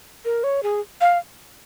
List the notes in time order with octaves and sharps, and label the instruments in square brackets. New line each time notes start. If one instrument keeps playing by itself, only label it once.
[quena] A#4
C#5
G#4
F5